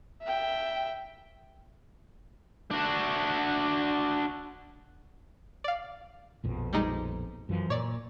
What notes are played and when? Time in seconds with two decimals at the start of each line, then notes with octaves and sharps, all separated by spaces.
0.22 E5 G5
2.71 D4 F#4
5.64 D5 F5
6.44 A#1 F2 B2
6.73 G3 G#3 D#4
7.49 F#2 E3 F3
7.70 A#2 C#5 D5